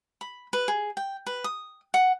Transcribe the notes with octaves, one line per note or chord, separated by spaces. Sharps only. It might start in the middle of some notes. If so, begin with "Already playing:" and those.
B5
B4
G#4
G5
B4
D#6
F#5